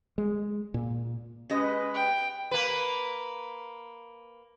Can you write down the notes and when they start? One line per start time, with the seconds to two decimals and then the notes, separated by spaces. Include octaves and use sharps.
0.18 G#3
0.74 A#2
1.50 G#3 C#4 G4 B4 D#5
1.95 G5
2.51 A#3 B4